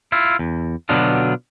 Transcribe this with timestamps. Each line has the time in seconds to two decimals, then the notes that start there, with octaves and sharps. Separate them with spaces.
0.12 E4 F4
0.39 E2
0.89 B2 D3 F#3 B3 D4 F4